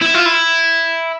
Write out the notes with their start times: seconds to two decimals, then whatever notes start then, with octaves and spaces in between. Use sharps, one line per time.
0.02 E4
0.14 F4
0.25 E4